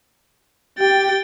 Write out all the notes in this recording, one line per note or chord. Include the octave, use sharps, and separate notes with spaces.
G4 G5 A6